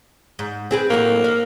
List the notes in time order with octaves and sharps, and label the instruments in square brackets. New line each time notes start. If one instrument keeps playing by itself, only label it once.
[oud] G#2
C4 G#4 B4
[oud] A2 F#3 C4 [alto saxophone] A#3
[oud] F5